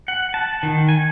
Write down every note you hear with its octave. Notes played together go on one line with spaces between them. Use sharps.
F#5
A5
D#3
G#5